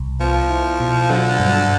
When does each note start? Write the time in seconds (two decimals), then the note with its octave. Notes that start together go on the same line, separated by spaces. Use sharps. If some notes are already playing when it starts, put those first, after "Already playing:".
Already playing: C2
0.20 F3 B3
0.50 E4
0.80 B2
1.10 D3 F#3
1.40 G2